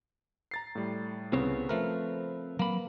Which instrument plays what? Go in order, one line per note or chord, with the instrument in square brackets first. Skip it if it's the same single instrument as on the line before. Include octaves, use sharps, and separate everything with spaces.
[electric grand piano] A#5 A6 C7
A2 G3
[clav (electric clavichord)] C2 [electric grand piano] C#3 B3 [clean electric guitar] C4 C5 C#5
[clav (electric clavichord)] F3 A3 A#4 [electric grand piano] B4
[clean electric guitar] F#3 B5 [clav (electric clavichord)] A#3